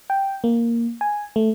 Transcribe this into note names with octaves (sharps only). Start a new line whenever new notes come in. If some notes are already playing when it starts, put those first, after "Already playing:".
G5
A#3
G#5
A3